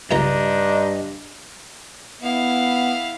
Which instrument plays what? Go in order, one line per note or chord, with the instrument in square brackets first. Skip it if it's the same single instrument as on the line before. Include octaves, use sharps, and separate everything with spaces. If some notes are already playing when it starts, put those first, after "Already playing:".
[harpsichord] C#2 G#3 A#5 [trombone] G2 [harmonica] D4 D#4 [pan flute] D#5
[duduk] B3 [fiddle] E4 F5